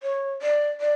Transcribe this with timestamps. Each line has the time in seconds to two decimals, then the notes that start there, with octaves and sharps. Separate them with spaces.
0.03 C#5
0.42 D5
0.81 D5